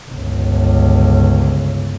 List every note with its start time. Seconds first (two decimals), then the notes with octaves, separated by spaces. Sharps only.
0.10 G1 C#2